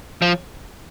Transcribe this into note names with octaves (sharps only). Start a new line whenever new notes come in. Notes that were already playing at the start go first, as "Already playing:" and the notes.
F3